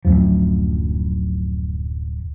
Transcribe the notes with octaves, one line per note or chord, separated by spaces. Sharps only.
D1 B1 F#2 F3